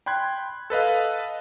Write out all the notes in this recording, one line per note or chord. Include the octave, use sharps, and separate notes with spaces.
G5 B5 C6 F#6 G#6
A4 B4 D#5 F5